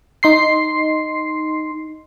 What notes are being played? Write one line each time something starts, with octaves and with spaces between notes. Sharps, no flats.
D#4 C6 C7